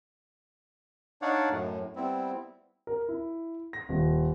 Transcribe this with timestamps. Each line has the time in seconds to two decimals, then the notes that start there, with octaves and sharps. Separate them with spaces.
1.22 D4 D#4 C#5 D5 F5 F#5
1.51 F#2 A2
1.96 G3 B3 C4 E4
2.87 A#4
3.09 E4
3.73 A#6
3.89 D#1